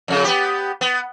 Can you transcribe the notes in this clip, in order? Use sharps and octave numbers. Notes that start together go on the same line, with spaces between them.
F2 C#3
B3 G4
B3